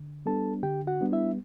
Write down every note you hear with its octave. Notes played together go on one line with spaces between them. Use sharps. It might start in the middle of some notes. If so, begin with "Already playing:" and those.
Already playing: D3
G3 B3 D4 A4 A5
D3 G4 G5
F#4 F#5
G3 B3 D4
E4 E5